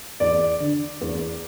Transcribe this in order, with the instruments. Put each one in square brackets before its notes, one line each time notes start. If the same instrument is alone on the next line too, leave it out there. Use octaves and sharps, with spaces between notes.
[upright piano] E2 D5
D3
E2